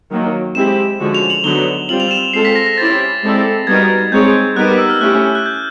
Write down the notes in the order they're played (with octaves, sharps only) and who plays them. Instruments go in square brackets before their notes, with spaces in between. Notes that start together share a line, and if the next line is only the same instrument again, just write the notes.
[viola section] D#3 F#3 A#3
[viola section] G#3 C4 E4 G4 [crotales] E7
[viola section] D3 F3 G#3 C#4 F#4
[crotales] F7
F#7
[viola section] D3 F#3 B3 D#4 [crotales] G7
[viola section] G3 C4 F4 [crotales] F#7
[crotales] F7
E7
[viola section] G#3 C4 F4 A4 [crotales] C7
[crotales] B6
A#6
A#6
[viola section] C#4 E4 G4 C5 [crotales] A6
[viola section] G#3 C4 E4 A4 D5
[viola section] G3 B3 D#4 F#4 A#4 [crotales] G#6
[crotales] G#6
[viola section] G#3 C4 D#4 G#4 C#5 [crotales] G6
[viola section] G3 B3 D#4 G4 A#4 [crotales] F#6
[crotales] D6
E6
F6
[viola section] A3 C#4 E4 G4 [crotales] F#6
[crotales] F#6
G6